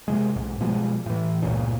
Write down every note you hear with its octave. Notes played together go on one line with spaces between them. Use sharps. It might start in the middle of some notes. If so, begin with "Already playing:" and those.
C3 D#3 G#3
B1 G#2
B2 F3 G3 G#3
A2 E3
G1 C#2 A#2 C#3